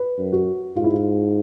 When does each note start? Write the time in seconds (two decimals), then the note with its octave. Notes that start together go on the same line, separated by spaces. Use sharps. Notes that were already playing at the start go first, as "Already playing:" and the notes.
Already playing: B4
0.18 F#2
0.32 F#4
0.76 G#2 F4
0.84 E4
0.93 F4